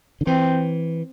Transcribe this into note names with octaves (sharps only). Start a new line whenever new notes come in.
D3
E3 C4